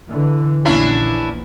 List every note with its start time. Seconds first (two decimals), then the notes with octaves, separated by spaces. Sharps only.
0.10 D3 E3
0.65 A#1 E2 A#2 C#4 D4 E4